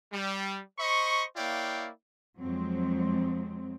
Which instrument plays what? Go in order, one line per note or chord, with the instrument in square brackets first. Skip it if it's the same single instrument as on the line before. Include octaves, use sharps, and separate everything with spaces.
[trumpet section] G3
C5 D#5 B5 C#6
A#3 E4 C#5 D5 F5 G5
[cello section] F2 F#3 G#3 C4